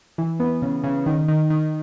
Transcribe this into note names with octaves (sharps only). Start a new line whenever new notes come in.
E3
B3
C#3
C#3
D#3
D#3
D#3